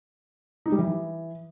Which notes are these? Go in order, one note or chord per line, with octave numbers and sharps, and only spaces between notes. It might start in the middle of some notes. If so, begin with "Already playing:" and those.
D#4
G3
E3